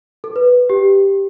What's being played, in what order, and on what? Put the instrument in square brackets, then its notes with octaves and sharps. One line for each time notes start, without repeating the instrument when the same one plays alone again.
[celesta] A4
B4
G4